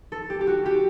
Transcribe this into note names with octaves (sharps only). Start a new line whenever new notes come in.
A4
G4
G4
F#4
G4